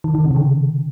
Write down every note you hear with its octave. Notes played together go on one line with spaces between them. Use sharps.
D#3
D#3
C3
D#3
C#3